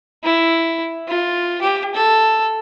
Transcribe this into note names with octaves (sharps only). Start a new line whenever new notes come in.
E4
F4
G4
A4